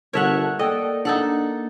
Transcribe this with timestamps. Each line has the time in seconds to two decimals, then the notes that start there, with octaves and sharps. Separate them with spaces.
0.13 G1 A#4 C#5 E5 F#5 A5 F#6
0.59 A#3 A4 D5 D#5 G5
1.05 D4 D#4 A4 F#5